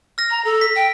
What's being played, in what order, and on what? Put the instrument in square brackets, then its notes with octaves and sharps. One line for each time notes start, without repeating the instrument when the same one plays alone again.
[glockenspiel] F6 A#6
[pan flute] A#5
A4
[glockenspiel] B6
[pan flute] G5